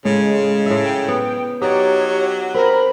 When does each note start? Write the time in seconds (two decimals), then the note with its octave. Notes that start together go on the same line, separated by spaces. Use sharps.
0.05 A2 C#3 G#3
0.66 A2 E5
0.84 G5
1.08 B3
1.62 F#3 D#4 G4 C#5 D5
2.54 C4 A#4 B5